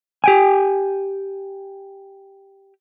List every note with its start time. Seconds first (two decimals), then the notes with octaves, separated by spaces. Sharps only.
0.24 G4 G5 G#5